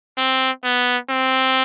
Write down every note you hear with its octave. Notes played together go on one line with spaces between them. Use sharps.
C4
B3
C4